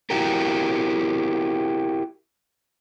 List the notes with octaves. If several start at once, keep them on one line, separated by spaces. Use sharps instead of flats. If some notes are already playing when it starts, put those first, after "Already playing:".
E4 F#4 G4 A#4